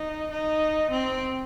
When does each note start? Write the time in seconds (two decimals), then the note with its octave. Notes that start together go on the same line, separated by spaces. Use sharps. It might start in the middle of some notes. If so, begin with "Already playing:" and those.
Already playing: D#4
0.31 D#4
0.91 C4